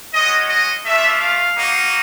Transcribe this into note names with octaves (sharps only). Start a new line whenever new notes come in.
G#3 C#4 F#4 D#5
D#5
A3 D4 F4 E5
F5
A#3 D#4 F#4